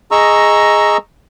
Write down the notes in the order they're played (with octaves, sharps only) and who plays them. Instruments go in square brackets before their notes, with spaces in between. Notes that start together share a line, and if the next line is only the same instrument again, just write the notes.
[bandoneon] G#4 D#5 A#5 C#6 E6